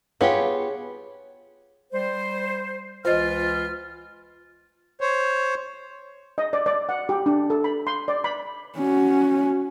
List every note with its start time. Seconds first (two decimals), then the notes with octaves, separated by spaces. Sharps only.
0.21 B3 F4 G4 G#4 C#5
1.92 G3 C5
3.05 C#2 E3 F4 C5 D#5 F6
5.01 C5 C#5
6.38 D#5
6.53 D5
6.66 D5
6.89 F#5
7.09 G4
7.26 D4
7.50 A4
7.64 B5
7.87 C6
8.08 D5
8.24 B5
8.78 C#4 F#4